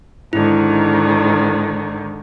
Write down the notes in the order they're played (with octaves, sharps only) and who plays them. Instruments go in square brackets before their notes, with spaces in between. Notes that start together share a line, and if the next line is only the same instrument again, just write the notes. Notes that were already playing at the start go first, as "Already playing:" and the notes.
[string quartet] G#2 D3 D#3 [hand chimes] E4